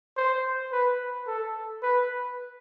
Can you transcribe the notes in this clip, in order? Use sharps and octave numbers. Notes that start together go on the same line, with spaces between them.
C5
B4
A4
B4